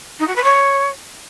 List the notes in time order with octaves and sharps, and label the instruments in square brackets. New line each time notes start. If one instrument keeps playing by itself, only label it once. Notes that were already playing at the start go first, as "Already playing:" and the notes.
[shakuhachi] D#4
F#4
B4
C#5